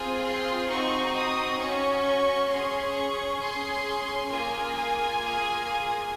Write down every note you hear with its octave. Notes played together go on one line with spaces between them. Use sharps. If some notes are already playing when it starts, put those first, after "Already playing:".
Already playing: C4 F4 G#4 G#5
C6
C4 D#4 F#4 C#6
D#6
C#4 F#4 C#6
C#6
C#4 G#4 C6
C#6
C#4 G#4 C6
A#3 F4 G#4 G#5
G#5
A#3 F4 G#4